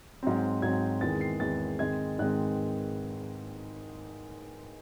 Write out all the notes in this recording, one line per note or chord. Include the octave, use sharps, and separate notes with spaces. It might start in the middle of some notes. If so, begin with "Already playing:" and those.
G#2 F#3 C4
G#2 F#3 C4 G#6
E2 D#3 G#3 C4 A6
C7
E2 D#3 G#3 C4 A6
G#2 D#3 G#3 C4 G#6
G#2 D#3 G#3 C4 F#6